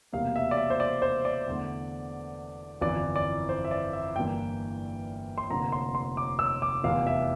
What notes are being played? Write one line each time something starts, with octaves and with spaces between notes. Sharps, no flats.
E1 E2 C3 G3 A#3 F5
E5
D5
E5
C5
D5
C5
D5
E2 D3 A3
G1 F2 E3 D5
D5
C5
E5
D5
E5
G1 G2 E3 A#3 G5
C6
F1 F2 D3 F3 A#3 A#5
C6
C6
D6
E6
D6
F1 E2 E3 F5
E5